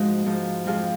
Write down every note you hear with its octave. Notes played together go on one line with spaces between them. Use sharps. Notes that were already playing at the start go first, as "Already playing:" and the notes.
Already playing: G#2 F3 G#3 D#4 F#4
G#2 F3 G#3
F2 F3 G#3 F4 G#4